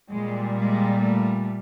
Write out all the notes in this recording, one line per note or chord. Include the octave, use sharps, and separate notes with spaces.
A#2 G3 G#3
G#3
A3